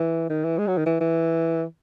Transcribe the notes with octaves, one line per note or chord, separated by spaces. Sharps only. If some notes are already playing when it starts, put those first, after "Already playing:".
Already playing: E3
D#3
E3
G#3
F#3
D#3
E3
E3